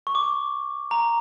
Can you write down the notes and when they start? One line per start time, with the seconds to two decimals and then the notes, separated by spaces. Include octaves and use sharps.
0.07 C#6
0.15 D6
0.91 A#5